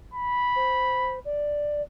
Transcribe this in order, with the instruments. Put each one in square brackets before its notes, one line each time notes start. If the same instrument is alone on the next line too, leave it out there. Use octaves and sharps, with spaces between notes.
[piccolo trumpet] B5
[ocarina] C5
D5